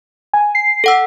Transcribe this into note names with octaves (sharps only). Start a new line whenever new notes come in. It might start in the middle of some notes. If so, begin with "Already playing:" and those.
G#5
C7
A4 F#5 E6